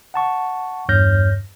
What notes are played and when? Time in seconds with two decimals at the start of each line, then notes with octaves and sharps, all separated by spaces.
0.14 F#5 A5 C#6
0.89 E2 G2 C#5 F6 G6 A#6